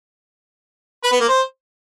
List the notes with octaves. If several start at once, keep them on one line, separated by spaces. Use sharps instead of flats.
B4
B3
A#3
C5